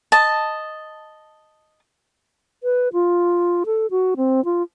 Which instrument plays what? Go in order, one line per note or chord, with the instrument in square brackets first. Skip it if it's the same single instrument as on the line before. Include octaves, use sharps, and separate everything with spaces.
[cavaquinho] D#5 A5
[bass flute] B4
F4
A4
F#4
C4
F4